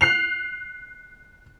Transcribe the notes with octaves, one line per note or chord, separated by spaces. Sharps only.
F#6 C7 F7